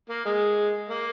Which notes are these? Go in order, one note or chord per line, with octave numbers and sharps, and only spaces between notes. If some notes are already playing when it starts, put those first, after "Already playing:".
A#3
G#3
A#3